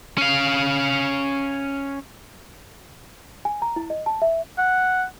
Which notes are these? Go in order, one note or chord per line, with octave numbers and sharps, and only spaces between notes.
C#4 F5
G#5
A#5
E4
D#5
A5
E5
F#5